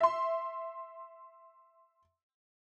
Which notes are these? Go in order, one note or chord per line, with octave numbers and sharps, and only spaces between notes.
E5 C6